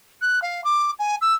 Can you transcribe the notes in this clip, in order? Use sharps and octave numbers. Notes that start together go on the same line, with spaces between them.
F#6
F5
D6
G#5
E6